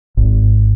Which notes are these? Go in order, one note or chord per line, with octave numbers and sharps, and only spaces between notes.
G#1